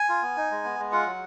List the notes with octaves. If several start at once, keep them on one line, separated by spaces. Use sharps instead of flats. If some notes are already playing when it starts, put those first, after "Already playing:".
Already playing: G#5
F4
B3
D#4
G#3
B3
G#3
F4 F#5
F#3